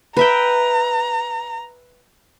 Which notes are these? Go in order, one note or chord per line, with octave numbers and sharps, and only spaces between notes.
B4 E5 G5 A#5